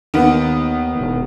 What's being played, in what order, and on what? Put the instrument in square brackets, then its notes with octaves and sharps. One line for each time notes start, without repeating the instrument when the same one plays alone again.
[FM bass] D#2 [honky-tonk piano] D#3 B3
[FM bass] E1